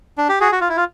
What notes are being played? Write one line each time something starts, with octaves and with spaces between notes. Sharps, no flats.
D4
G4
F#4 G#4
F#4
F4
E4
F4